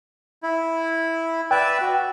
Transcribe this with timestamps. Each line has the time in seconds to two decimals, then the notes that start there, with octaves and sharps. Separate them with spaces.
0.43 E4
1.51 B4 D5 E5 G5
1.81 F#4